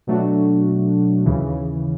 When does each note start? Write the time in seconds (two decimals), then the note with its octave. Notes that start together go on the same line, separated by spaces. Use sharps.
0.07 B2 F#3 A3 D4 F#4
1.26 D#2 C#3 E3